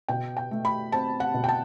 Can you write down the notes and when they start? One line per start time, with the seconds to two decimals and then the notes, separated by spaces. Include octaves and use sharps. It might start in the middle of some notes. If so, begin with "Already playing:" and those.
0.08 B2 G5
0.37 G5
0.51 A3
0.65 B5
0.92 C4 A5
1.20 F#5
1.34 B2
1.44 G5
1.48 A5